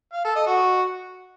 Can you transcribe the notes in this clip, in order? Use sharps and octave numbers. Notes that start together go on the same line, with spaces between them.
F5
A4
D#5
F#4